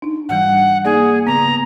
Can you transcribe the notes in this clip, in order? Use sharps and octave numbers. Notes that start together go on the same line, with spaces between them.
D4 D#4
G#2 E3 G3 F#5
A#3 D#4 G#4 D5
C#3 B3 A#5